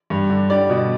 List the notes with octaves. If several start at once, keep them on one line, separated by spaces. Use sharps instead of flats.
G2
D3
G3 D5
B2